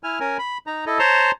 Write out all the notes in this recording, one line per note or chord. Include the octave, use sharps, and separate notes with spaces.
E4 G#5 F6
C#4 A#4 G#5
B5
D#4 A#5
E4 A4 D#5
C5 C#5 A5 A#5 C6